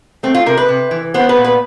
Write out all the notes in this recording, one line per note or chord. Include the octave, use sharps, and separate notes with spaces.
A3 C4
F4
C3 A#4
B4
C3
E3
B3 C5
B4
A#2
B4